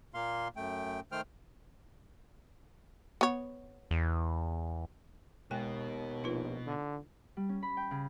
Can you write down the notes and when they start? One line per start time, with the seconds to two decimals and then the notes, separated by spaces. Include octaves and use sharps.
0.14 A#2 A#3 F5 C6
0.56 F#2 A3 G5
1.12 D#3 A3 C5 G5 F6
3.21 B3 C#5
3.91 E2
5.51 D#2 B2 G#3 G5 G#5
6.24 A#1 D#4 F4 B4
6.66 D3
7.37 G3
7.49 C#4
7.63 B5
7.77 G5
7.91 C#3